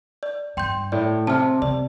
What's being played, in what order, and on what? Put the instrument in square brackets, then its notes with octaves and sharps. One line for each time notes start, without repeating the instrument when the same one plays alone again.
[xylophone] D5
[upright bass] G2 [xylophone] G5 C6 G6
[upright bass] A2 [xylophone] D5
[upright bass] C3 [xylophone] A5 F6
[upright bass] C3 [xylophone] D5